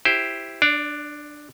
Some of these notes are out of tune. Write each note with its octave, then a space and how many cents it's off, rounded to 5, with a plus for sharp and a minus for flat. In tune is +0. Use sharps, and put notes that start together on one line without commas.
E4 +0 G4 +0 C5 +0
D4 +10 D5 -35